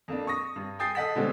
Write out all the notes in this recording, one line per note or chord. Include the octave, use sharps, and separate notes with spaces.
F2 A#3 D4
C#6 D#6 A#6
G2
G5 G#5 D#6 G6 A6 C7
A4 D#5 F#5 B6
B2 D3 G3 G#3 C4 C#4